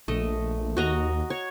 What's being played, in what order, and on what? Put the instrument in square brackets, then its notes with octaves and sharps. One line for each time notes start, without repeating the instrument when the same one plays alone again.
[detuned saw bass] A#1 [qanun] A3 D#5
[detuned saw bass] D#2 [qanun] F#4 D#5 A#5
[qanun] C#5